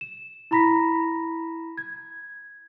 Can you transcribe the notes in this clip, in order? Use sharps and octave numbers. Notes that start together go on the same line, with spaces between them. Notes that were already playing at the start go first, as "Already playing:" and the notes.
E7
E4 A#5 B5 A#6 B6
G#6